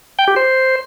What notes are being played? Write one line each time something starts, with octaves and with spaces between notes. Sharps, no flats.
G5
G4
C5